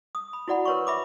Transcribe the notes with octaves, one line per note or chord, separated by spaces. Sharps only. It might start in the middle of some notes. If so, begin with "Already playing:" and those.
D#6
B5
E4 F#4 D5 F#5 B5
A#4 B4 C#5 C6 C#6
E5 B5 D6